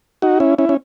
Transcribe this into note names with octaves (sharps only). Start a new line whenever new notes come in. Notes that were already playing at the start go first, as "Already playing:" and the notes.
D#4 F#4
C#4 E4
C#4 E4
C#4